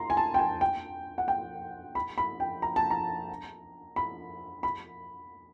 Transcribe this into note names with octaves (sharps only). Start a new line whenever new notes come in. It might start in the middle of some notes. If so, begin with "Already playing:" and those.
Already playing: A#5 C6
G#5
A5
G5
G#5
G5
F#5
G5
B5
B5
G5
A#5
A5
A#5
B5
B5